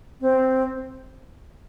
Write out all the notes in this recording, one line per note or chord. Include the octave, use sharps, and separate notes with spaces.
C4